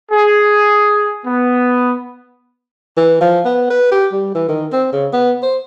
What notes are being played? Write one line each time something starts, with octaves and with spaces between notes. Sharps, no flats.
G#4
B3
E3
F3
B3
B4
G4
G3
E3
D#3
C4
C#3
B3
C5